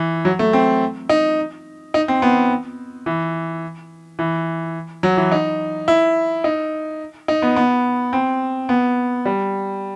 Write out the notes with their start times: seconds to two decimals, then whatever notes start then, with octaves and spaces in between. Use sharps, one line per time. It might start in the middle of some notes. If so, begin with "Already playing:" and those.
Already playing: E3
0.25 F#3
0.39 A3
0.53 C4
1.09 D#4
1.94 D#4
2.08 C4
2.22 B3
3.06 E3
4.19 E3
5.03 F#3
5.17 E3
5.32 D#4
5.88 E4
6.44 D#4
7.28 D#4
7.42 B3
7.56 B3
8.13 C4
8.69 B3
9.25 G3